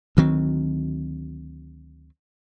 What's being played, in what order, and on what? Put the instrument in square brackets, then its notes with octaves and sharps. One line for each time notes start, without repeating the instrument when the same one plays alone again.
[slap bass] D2 D#3 F#3 C4